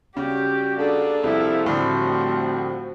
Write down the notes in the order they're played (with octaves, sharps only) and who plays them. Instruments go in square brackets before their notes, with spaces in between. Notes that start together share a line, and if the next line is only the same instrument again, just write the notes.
[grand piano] C#3 [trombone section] G3 F#4 [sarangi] G4
[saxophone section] A#3 G#4 A4 [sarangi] D4
[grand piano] C2 [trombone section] F3 [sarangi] E4
[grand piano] A2 D3 [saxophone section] G3 A3 C4 [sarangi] F#4